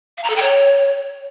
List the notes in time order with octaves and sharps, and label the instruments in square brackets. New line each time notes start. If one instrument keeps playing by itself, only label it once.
[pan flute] F5
A#5
A4
G5
C#5